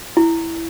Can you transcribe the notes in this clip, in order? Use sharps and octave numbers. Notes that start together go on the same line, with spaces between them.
E4